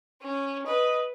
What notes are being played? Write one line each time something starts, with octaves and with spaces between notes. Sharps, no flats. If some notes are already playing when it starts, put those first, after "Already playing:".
C#4
B4 D#5